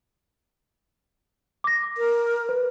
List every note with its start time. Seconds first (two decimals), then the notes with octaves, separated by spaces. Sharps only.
1.64 D6 A#6
1.97 A#4
2.49 B4